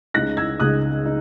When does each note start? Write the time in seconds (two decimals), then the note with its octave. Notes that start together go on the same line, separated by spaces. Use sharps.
0.14 C#2 C#3 G#3 D#4 F#6 A#6
0.37 E6 G#6
0.60 C#2 C#3 G#3 D#4 D#6 F#6
1.06 D#4